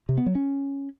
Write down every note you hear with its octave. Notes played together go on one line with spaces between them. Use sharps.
C3
B3
F#3
C#4